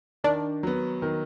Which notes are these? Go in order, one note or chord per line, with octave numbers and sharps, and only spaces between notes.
D#3 D4
F#3 B3
D#3